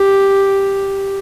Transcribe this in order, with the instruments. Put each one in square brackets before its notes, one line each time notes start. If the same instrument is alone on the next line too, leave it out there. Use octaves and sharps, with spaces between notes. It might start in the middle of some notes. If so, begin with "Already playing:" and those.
Already playing: [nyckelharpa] G4